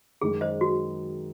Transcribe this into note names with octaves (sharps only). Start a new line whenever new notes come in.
F#2 D#3 G#3 G#4
C5 D#5
F#4